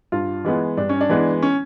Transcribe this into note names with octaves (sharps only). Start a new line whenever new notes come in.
G2 F4
E3 G#3 B3
G2 D4
C#4
D4
E3 G#3 B3
C#4